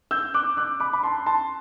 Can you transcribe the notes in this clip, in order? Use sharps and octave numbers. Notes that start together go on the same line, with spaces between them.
E6 G6
D6 F#6
D6 F#6
B5 D6
B5
A5 C6
A5 C6